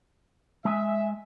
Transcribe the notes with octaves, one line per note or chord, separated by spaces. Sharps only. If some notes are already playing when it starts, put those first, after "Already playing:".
G#3 E5 G#5